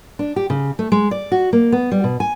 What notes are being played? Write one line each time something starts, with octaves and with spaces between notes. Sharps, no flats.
D4
G4
C#3
A3
G#3
D5
F#4
A#3
B3
G3
B2
G#5